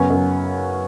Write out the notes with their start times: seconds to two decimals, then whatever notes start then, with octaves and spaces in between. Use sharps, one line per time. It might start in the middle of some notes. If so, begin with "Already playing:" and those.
Already playing: F#2 C#3 B3 C#4
0.10 F#2